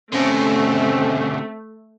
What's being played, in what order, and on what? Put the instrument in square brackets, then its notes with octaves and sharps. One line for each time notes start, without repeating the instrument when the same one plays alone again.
[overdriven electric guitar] B2 D3 [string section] A3 [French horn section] C4 [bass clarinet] C#4